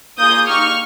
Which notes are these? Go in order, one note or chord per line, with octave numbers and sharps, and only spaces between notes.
A#3 F4 G#4 D#6 G6
A#3 D#4 G4 C#6 F6